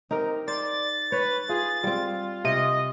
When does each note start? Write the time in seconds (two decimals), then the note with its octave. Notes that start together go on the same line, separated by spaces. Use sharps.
0.11 C4 D#4 G4 A#4
0.48 C5 D5 A6
1.12 B4 C#5
1.49 F4 G#4
1.84 G3 C4 F4
2.44 C3 D#5